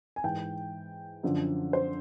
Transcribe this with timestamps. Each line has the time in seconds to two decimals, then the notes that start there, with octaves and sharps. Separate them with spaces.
0.16 G#5
0.24 G#2 E3 G5
1.23 F#2 D3 F3
1.73 C5